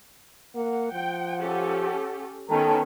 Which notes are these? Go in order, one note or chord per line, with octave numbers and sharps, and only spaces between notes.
A#3 F#5
F3 G5
C#4 G4 A4
D#3 B3 C#4 A4 G5 A5 A#5